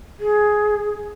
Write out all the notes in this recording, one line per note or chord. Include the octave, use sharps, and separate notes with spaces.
G#4